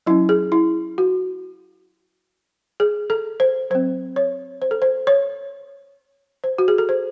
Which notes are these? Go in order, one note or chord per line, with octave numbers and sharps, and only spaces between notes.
F#3 C#4 E4
G#4
E4
F#4
G#4
A4
C5
F#3 C4 C5
C#5
C5
A4
C5
C#5
C5
F#4
G#4
A4
C5